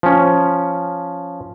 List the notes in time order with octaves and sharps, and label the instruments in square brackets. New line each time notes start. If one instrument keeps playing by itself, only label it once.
[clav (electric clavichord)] F3 C#4